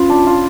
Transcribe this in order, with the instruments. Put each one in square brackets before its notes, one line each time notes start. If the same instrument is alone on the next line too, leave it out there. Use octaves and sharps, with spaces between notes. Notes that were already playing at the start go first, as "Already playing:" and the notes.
Already playing: [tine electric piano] C#4 [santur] F4 B4
[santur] D4
F4